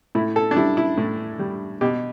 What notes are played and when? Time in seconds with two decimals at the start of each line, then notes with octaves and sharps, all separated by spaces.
0.15 A2 E4
0.36 A4
0.51 D4
0.56 G3 E4
0.77 E4
0.98 A2
1.39 G3
1.81 B2 G4